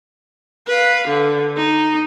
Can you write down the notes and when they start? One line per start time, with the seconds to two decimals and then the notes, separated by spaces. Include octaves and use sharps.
0.67 B4 F5
1.08 D3
1.57 D#4